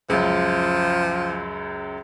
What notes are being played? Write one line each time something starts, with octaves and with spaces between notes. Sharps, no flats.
C#2 F#2 F3